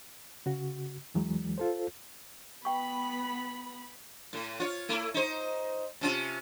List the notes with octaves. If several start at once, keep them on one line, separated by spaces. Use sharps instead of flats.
C#3 F#4
E2 E3 F#3 G#3
F4 A4 C5
B3 G5 B5 C#6
A2
F4 C#5
A3 E4
D#4 C5
C3 C#4 F4